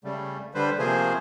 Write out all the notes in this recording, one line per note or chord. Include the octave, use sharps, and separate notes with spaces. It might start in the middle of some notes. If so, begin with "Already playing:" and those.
C#3 G3 A3
D3 G3 B4 C5
C3 F3 A3 A#3 G#4 C5